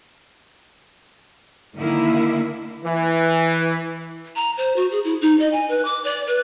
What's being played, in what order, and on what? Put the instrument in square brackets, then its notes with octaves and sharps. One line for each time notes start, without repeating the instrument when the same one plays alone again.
[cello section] D3 D#3 A#3 E4
[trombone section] E3
[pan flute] A#5
C5
F#4
G#4
E4
D#4
D#5
G#5
B4
D6
D5
B4